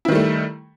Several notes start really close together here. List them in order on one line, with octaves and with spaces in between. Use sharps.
E4 D#3 G3 A3